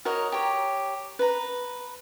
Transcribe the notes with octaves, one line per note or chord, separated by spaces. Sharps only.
F#4 A#4 C#5 D#5
G4 C#5 A#5
B4 A#5